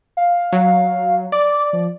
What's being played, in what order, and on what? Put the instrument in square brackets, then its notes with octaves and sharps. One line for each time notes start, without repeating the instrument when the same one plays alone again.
[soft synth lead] F5
[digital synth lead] F#3
[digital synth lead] D5 [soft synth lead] D6
[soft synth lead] F3